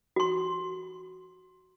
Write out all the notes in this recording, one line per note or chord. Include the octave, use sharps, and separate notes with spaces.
F#4 C6